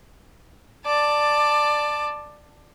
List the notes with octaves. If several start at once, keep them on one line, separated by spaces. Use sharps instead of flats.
D5 A5